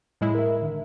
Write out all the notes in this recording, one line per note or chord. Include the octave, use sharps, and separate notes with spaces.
A2 G#3 E4
A#4 E5
D3 D#3